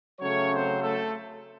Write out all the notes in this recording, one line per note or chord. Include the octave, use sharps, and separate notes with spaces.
C#3 F#3 A3 C#4 C#5
C4 C5
A3 A4